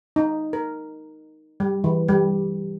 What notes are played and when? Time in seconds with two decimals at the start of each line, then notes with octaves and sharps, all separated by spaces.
0.16 D#4
0.53 A#4
1.60 G3
1.84 E3
2.08 G3